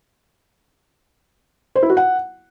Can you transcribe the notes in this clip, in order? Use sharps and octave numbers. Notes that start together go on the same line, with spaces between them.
C5
E4
F#4
F#5